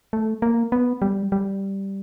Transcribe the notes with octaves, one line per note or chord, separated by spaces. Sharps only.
A3
A#3
B3
G3
G3